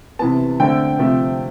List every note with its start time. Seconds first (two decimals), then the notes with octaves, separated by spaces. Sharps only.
0.19 C3 E3 B3 A5
0.60 D3 A3 C4 G5
0.98 C3 F3 A3 C4